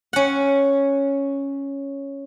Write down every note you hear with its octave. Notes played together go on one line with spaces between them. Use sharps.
C#4 F#5